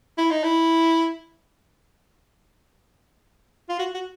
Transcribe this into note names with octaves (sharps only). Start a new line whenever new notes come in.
E4
D#4
E4
F4
F#4
F#4